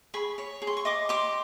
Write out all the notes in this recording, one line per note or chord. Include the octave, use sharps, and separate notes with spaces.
G#4 B5 C#6
C#5
G#4
C6
C#6
D#5 C6 D6
G4 C6 D6